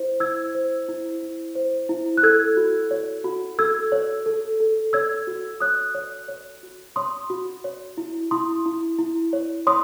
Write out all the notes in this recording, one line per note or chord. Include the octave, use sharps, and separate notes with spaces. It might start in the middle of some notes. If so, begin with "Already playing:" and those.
Already playing: E4 C5
E4 E6 G#6
C5
E4
E4
C5
E4
F#6
A4 E6 G#6
F#4
C#5
F#4
A4 E6 G#6
C#5
A4
A4
C#5 E6 G#6
F#4
C#5 D#6 F#6
C#5
C#5
F#4
C#5 C6 D#6
F#4
C#5
E4
E4 C6 D#6
E4
E4
C#5
C#5 C6 D#6